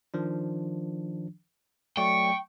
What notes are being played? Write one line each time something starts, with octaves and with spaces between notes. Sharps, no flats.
D#3 F3 D4
F#3 A3 D5 G5 C#6